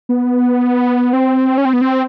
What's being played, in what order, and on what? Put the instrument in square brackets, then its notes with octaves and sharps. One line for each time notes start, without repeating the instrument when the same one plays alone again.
[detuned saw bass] B3
C4
C#4
C4
B3
C4